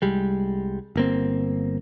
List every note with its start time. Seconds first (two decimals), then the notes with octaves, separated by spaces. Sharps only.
0.02 C2 G3 G#3
0.96 G1 A#3 C4